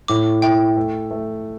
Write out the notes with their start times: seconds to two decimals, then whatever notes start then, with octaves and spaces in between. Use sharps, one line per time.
0.08 A2 D6
0.42 E4 G5
0.77 A3
1.11 A3